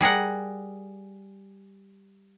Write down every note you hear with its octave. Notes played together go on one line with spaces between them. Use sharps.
G3 G#4 A#4 F#5